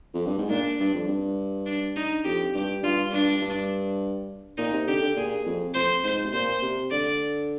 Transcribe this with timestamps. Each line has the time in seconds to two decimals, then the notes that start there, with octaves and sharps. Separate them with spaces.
0.14 F2
0.26 G2
0.38 G#2
0.50 A#2 D4
0.79 G2
0.94 F2
1.08 G2
1.66 D4
1.96 D#4
2.24 F2 G4
2.54 G2 G4
2.83 G2 F4
3.12 G2 D4
3.42 G2
4.58 A#2 D#4
4.73 C3
4.87 D3 G4
5.02 D3
5.16 A#2 G#4
5.46 F2
5.74 F2 C5
6.04 G#2 C5
6.26 C3
6.33 A#2 C5
6.62 C3
6.91 D3 D5